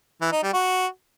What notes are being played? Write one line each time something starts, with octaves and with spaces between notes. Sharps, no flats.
E3
D#4
G3
F#4